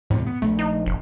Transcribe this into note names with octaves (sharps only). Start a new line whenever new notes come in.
E2 A2 C3
B3
A#1 A3
D#4
F#1